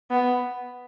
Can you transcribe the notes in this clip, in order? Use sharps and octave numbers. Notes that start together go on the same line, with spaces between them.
B3